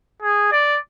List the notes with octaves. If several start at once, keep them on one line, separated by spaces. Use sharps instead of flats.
G#4
D5